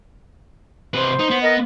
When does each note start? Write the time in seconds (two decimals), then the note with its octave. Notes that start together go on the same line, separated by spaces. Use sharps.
0.94 C3 B4 C5
1.19 D#4
1.30 B3
1.42 A#4 D#5